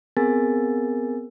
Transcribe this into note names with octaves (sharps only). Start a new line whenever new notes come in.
B3 C4 G#4 A#4 G#5 A6